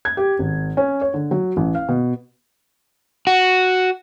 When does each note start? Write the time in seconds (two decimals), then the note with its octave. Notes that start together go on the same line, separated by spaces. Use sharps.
0.05 G#6
0.17 G4
0.39 G#1
0.77 C#4
1.01 C#5
1.14 D3
1.31 F#3
1.57 A1
1.75 F5
1.89 B2
3.27 F#4